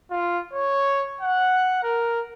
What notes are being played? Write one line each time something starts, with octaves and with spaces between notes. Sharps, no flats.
F4
C#5
F#5
A#4